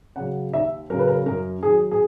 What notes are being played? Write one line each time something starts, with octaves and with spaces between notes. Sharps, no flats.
C#3 F#3 F#5
D#2 E5
C#3 F#3 A#4
B4
A#4
F#2 A#4
D#3 F#3 G#4
G#4